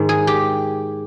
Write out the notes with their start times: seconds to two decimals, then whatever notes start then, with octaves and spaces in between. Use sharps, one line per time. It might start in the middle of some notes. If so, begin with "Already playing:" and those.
Already playing: G#2 D#3 G#3
0.09 G#4
0.27 G4